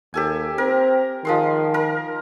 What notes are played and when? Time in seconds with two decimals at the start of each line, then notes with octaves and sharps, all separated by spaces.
0.14 D#2 G4 A4 G#5
0.58 C4 A#4
1.25 D#3 F3 G#3 C6
1.74 A#4